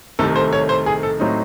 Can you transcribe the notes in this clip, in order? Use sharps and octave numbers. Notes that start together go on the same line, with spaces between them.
C2 C3 D#3 A3 A4
C5
C#5
C5
G#4
A4
A2 F#3 C4 D#4